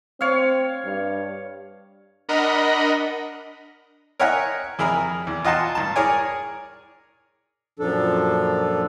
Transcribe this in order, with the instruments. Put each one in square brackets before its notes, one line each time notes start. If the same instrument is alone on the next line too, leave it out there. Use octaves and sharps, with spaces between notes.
[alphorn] C4 [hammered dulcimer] C#5 F5
[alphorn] G2
[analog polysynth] D4 A#4 D#5 F#5 A#5 B5
[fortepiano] A#4 C#5 D#5 E5 F#5 G#5
F2 E4 G#4 A#4 A#5
E2
F4 D#5 F#5 G#5 A5 C6
G2 A5
G#4 A#4 C#5 D5 G#5
[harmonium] F#2 A#2 F3 D4 A4